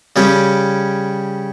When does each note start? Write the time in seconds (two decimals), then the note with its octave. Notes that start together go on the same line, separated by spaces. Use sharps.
0.16 C#3 G3 C#4 G4